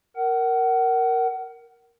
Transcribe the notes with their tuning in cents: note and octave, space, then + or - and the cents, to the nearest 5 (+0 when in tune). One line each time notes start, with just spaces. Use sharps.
A#4 +0 F#5 +30